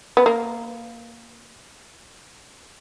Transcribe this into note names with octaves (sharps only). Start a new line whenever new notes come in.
B3
A#3